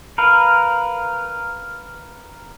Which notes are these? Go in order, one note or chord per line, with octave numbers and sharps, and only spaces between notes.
A#4 B4 F5